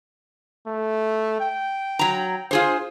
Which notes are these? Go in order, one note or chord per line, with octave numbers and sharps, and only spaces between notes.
A3
G5
F#3 A#5
F4 G#4 C5